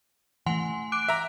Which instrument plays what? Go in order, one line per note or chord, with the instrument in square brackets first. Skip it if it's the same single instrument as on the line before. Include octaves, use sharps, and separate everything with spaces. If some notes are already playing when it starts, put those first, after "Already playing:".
[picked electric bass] E3 A3 [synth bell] F#5 G#5 C6
[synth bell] D6 F#6 D7
[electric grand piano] E5 A#5